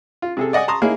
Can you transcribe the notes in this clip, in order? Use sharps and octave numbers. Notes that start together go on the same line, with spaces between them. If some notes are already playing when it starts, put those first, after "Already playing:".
F4
C3 G#4 A4
D5 D#5 F#5 G#5 D#6
A5 A#5 C6 C#6 D#6
A#3 C#4 D#4 E4 G#4 A#4